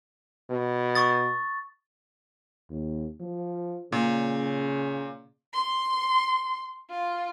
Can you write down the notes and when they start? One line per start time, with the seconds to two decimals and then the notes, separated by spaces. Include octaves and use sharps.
0.50 B2
0.95 C#6 D#6 A6
2.70 D#2
3.21 F3
3.92 A#2 C#3
5.54 C6
6.90 F4